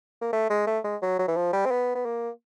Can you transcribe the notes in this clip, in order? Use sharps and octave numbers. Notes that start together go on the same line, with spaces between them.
A#3
A3
G#3
A3
G#3
F#3
F#3
E3
F3
G3
C4
B3
B3
A#3